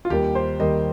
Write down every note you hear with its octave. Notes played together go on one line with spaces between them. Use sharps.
F4
D#2 D#3 G3 A#3 G4
C5
D#2 D#3 G3 A#3 D#5